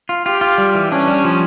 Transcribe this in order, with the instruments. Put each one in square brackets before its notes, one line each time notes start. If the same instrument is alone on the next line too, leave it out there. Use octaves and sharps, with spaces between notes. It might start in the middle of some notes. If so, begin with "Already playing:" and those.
[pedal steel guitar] F4
[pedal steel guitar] F4 [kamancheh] G4
[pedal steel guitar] F4
G3
E3
[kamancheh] C#4 [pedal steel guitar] D4
[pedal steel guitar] G3
F3